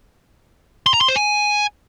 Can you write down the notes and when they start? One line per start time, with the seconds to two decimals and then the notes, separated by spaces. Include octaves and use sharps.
0.86 C6
0.94 A#5
1.01 C6
1.08 C5
1.16 G#5